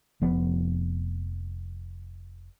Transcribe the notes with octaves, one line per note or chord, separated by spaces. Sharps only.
F1 F3 B3